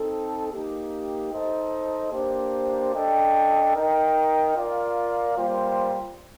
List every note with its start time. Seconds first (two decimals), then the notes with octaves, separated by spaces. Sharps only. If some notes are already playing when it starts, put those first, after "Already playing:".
Already playing: C4 D#4 A4
0.51 A#3 D#4 G4
1.31 D#4 A4 C5 D#5
2.12 A#3 D4 G4 C5
2.94 D4 A4 D#5 G5
3.74 D#4 A#4 D#5 G5
4.55 F4 A#4 D5 F5
5.37 G3 A#3 F4 C5 G5